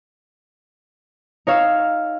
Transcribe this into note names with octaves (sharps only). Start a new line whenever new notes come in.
D#4 C#5 F5 E6